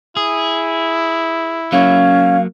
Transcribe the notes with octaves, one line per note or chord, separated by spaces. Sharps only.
E4 G#4
F#3 A#3 C#4 F5